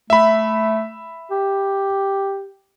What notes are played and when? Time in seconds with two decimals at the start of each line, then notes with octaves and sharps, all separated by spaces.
0.10 A3 E5 B5
1.31 G4